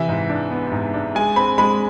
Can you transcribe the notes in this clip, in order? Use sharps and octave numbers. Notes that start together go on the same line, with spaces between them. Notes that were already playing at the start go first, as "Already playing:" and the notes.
Already playing: C3 E3 E5
G#2
D4
B3
G#2
D4
G#3 G#5
C4 B5
G#3 B5